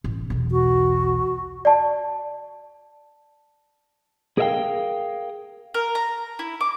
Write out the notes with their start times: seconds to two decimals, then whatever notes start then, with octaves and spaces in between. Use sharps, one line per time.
0.04 A1
0.30 B1 E2
0.51 F#4
1.65 D5 A5
4.38 G#4 A#4 D5 E5 F5 G5
5.74 A#4
5.95 A#5
6.39 E4
6.61 D6